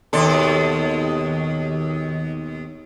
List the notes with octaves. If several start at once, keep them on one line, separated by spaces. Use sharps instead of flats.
D#2 B2 A4